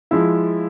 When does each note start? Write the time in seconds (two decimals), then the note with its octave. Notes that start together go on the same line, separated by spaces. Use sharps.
0.11 F3 G#3 E4